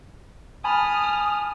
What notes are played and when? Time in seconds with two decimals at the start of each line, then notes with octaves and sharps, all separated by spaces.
0.64 G#5 A5 B5 D#6 F6